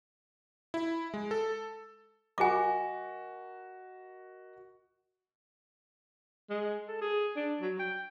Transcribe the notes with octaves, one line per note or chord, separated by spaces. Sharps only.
E4
G#3
A4
F#4 A#4 D#5 G#5 D6
G#3
A4
G#4
D4
F#3
G5